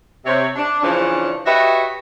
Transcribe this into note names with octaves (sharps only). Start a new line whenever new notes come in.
C3 C#5
D4
C#3 E3 F3 C#4 D4
F#4 G4 B4 C#5 D#5 E5